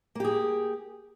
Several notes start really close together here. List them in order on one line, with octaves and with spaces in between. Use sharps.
A#3 G4 G#4